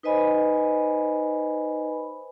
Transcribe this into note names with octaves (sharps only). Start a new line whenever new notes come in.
D#4 B4 C5 D#5 G#5 B5